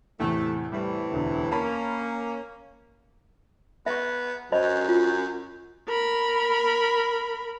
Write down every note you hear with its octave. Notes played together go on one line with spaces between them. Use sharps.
E2 A2 C3 A3
A2 C3 E3 G3
E1 D2 D3
A#3 C#4 A5 B5
A#5
B3 E5 C#6
F#2 C5 D#5 B5
F4
A#4 B5